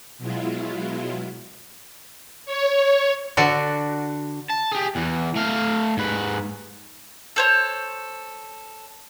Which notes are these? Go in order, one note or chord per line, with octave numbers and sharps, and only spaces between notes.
B2 F#3 G#3 E4 F4
C#5
D3 D4 F#4
A5
G4 G#4
E2 E3
A3 F5
G#2 B4
A4 C5 C#5